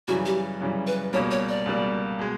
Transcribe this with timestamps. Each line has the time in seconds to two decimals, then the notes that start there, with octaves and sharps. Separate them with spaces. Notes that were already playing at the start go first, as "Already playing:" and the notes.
0.08 F#2 C#3 E3 G3 F#4
0.26 G4
0.61 F#2 C#3 E3 G3
0.87 B4
1.13 C#2 B2 G3 A#3 C#5
1.31 C#5
1.49 D5
1.66 C#2 B2 G3 A#3
2.19 B2 G#3